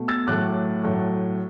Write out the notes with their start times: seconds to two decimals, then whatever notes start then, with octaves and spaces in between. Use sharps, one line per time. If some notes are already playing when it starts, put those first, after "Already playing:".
Already playing: B2 A3
0.08 E6 A6
0.27 A2 F#3 A3 D6 F#6
0.83 A2 F#3 A3